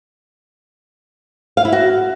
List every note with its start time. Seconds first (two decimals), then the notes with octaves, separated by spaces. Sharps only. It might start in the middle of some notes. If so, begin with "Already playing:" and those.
1.57 F5
1.65 E4
1.72 F#4